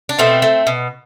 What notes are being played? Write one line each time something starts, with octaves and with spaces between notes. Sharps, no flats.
D4
B2 A3 C4
A3
B2